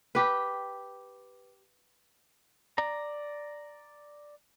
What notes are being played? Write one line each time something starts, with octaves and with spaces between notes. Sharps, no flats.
G4 B4
D5 A#5